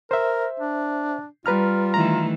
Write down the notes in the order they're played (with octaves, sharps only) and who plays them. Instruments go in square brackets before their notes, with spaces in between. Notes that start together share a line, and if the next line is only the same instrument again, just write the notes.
[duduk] A#4 [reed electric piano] C5 E5
[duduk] D4
[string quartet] G3 [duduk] F4 [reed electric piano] B4 A#5 F6
[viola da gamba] D#3 E3 A3 [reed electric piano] A#5